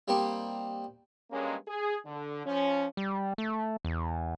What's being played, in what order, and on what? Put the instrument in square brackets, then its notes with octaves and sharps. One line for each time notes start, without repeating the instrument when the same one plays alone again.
[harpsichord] G3 A#3 C4 D#4 G4
[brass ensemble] G2 G#3 A#3 C#4
G#4
D3
F3 C#4
[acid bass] G3
A3
E2